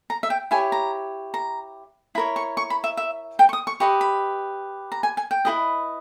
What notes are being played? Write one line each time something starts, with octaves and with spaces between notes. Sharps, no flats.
A#5
E5
G5
E4 G4 C#5 G#5
A#5
A#5
E4 A#4 C#5 B5
C#6
C#6
B5
E5
E5
G5
C#6
D#6
C#6
G4 B4 D#5 C#6
B5
A#5
G#5
G#5
G5
E4 G4 B4 D#5